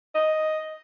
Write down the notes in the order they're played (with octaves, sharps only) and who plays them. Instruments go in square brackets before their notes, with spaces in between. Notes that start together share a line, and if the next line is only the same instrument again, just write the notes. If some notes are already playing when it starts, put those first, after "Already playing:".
[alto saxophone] D#5